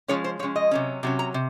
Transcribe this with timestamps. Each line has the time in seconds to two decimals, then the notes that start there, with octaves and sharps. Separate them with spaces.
0.08 F3 G#3 C#4 C#5
0.24 C5
0.39 F3 C#5
0.43 G#3 C#4
0.56 D#5
0.71 C3 F#3 C#4
1.03 C3 F#3 C#4
1.19 A#5
1.34 C3